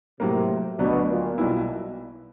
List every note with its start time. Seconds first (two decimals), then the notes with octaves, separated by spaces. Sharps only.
0.20 A2 C3 F#3 A#3
0.79 D2 B2 D3 F#3 B3 D4
1.09 A#2
1.38 B1 B2 G3 B3 E4